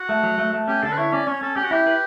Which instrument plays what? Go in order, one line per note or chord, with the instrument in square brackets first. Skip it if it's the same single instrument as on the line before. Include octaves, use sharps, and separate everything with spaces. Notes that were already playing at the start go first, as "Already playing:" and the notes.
Already playing: [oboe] F#4
[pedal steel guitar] A3
F#3
A3
A3
[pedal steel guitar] C#4 [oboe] G4
[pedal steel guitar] D3 [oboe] A4
[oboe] B4
[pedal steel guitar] E4 [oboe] C#5
[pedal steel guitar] C#4 [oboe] D5
[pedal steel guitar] C#4 [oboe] C#5
[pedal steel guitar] C#4 [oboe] A4
[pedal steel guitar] C#4 [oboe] G4
[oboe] F#4
[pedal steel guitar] E4 [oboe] G4
[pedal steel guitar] B4